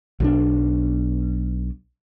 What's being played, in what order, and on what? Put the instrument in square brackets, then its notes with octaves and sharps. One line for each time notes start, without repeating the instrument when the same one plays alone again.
[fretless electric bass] B1 D#3 D4